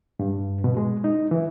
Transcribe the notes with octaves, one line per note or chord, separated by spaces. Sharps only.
G2
B2
G#3
D#4
E3